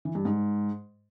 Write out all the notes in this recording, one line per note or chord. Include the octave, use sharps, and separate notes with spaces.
E3
G2
G#2